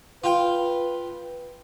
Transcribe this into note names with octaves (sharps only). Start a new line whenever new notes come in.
F4 B4 G5